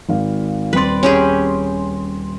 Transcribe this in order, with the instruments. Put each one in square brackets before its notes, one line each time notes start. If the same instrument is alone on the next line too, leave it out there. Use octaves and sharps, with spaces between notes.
[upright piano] G#1 F5
[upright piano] D#1 C4 C6 [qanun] B4 D5
[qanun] C#4 G4 G#4